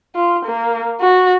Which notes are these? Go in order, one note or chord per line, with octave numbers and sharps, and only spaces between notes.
F4
A#3
F#4